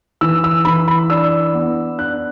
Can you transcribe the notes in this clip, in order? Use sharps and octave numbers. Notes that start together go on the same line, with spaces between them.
E3 E6
E6
E3 B5
B5
D4 E6
B3
D4 F#6